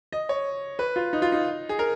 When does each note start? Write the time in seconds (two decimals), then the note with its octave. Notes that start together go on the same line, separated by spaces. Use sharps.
0.13 D#5
0.29 C#5
0.79 B4
0.96 F4
1.13 D#4
1.22 F4
1.32 D#4
1.69 G#4
1.79 A#4